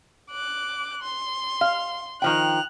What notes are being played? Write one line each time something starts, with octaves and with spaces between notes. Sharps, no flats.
D6 F#6
C6
F5
D#3 F3 G5 F#6 F7